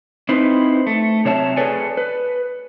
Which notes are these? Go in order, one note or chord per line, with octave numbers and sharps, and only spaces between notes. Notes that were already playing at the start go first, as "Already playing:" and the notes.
C4 D#4 E4 B4 C5
A3
C3 F#3 C#5 E5 A5
G#4 A4 B4 C#5 D5 G#5
B4